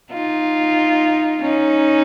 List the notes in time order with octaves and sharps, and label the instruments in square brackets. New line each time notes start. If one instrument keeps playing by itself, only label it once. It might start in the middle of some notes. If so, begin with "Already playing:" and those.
[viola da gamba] D#4 F4
C#4 D#4